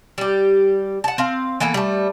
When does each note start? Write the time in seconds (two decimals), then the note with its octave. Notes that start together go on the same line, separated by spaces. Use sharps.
0.18 G3 G4
1.04 F#5 A5
1.18 C4 F5
1.60 E3 A#3 B3 A4
1.74 G3 A3